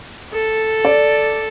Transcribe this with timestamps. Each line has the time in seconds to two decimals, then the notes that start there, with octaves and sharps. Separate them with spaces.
0.33 A4
0.85 D5